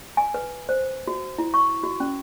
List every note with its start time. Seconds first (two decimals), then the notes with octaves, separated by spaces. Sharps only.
0.17 G#5
0.34 B4
0.69 C5
1.08 F#4
1.38 E4
1.54 C#6
1.83 F#4
2.00 C#4